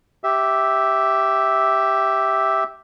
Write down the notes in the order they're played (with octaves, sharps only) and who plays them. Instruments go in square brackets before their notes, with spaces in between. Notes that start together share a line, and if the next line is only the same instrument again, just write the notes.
[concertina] G4 E5